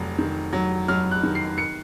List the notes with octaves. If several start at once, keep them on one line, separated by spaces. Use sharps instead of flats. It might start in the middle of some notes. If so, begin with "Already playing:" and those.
Already playing: F1 F#3
D#3
F#3
F#3 F6
F#6
D#3
C7
C#7